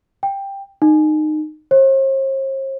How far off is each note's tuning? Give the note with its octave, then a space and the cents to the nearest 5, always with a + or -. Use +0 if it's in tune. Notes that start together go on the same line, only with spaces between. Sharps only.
G5 +5
D#4 -20
C5 +45